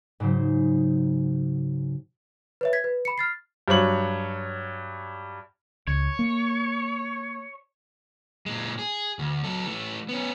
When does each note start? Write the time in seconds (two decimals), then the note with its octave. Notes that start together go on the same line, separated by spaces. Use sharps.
0.20 G#2 C#3 F#3 C5
2.61 B4 C#5 E5
2.73 G#6 B6
2.84 B4
3.05 B5 C#7
3.18 F6 A6 C7
3.68 G2 F#3 C#5 F#7
5.87 C#2 C#5
6.19 A#3
8.46 A#2 G#3
8.79 G#4
9.19 D2
9.44 F#3 A4
9.66 E3 A3
10.09 B3 C#4